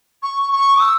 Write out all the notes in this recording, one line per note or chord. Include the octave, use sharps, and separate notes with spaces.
C#6
C#6
E6